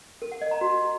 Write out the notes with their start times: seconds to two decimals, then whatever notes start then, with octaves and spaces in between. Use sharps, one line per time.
0.22 A#4
0.32 F#5
0.41 D#5
0.51 A#5
0.61 F#4